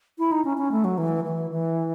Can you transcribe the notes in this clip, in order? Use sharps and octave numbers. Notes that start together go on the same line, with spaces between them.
E4
D#4
C#4
C#4
A3
F#3
E3
E3
E3